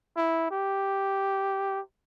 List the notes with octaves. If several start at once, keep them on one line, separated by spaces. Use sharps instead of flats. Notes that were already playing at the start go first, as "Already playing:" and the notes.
E4
G4